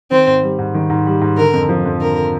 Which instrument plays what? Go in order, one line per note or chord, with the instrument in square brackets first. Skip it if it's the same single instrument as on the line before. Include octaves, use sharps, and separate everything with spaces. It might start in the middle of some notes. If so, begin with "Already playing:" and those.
[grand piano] D#3 [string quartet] C4
[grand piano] G#2
G3
G#2
D#3
G#2
G3
G#2
[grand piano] D3 [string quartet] A#4
[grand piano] F2
F3
F2
[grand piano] D3 [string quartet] A#4